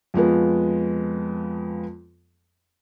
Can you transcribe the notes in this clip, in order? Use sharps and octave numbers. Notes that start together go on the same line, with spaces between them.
F2 F3 G#3 B3